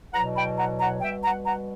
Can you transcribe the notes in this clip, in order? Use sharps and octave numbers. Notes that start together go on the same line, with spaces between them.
E2 B2 F#3 F#5 A#5
G5 B5
F#5 A#5
F#5 A#5
B2 G3 E5 G5
F#5 A#5
F#5 A#5